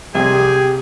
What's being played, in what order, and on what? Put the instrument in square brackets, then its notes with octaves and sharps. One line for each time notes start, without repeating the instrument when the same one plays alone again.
[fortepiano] C2 G3 C4 [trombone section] G4 [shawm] G#4